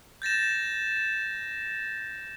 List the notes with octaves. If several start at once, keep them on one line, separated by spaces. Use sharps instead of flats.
G6 A6 A#6 E7